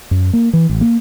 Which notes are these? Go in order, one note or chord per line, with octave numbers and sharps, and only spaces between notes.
F#2
A#3
E3
A1
A#3